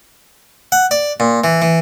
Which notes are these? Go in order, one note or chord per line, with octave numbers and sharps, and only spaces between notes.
F#5
D5
A#2
E3
E3